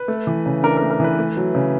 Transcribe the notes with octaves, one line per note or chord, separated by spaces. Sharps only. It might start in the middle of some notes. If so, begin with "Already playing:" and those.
Already playing: B4
A3
E3
C#3
D4 A#4
A#4
A3
A#4
E3 B4
A3
F#3
C#3